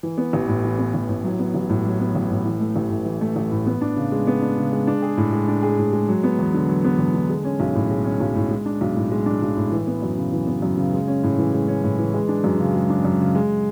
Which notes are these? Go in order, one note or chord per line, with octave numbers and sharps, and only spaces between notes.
E3
B3
A1
A2
E3
B3
A1
A2
F#3
B3
A1
A2
F#3
B3
A1
A2
E3
A3
A1
A2
E3
A3
A1
A2
B3
D4
C#3
G#3
B3
D4
C#3
G#3
D4
G#4
A2
G#3
D4
G#4
A2
G#3
F#3
B3
E2
D3
F#3
B3
E2
D3
G#3
C#4
B1
A2
G#3
C#4
B1
A2
G#3
D4
B1
A2
G#3
D4
B1
A2
E3
B3
F#2
C#3
E3
B3
F#2
C#3
G#3
C#4
A2
E3
G#3
C#4
A2
E3
G#3
D4
F#2
C#3
G#3
D4
F#2
C#3
G#3